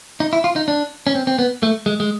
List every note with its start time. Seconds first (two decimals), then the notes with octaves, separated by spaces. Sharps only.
0.20 D#4
0.33 E4
0.44 F4
0.56 D#4
0.68 D4
1.07 C#4
1.15 C4
1.27 C4
1.39 B3
1.63 A3
1.86 G#3
2.00 G#3